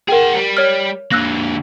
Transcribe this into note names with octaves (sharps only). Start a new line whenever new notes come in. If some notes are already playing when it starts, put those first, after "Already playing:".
G#4 A#4 F#5 G5
G3
C#5 F6
D3 A#3 E6 F#6 A#6